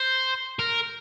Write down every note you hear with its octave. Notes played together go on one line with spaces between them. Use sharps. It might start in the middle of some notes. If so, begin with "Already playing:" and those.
Already playing: C5
A#4